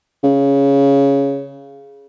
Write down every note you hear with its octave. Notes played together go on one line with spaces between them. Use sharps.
C#3